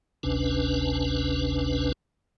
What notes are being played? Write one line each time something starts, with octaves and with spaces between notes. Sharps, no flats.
G#1 D2 C3 C#4 D4 B4